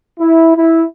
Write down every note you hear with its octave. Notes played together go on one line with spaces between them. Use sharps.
E4
E4